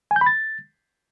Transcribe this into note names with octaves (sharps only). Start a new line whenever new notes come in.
G#5
G6
B5
A6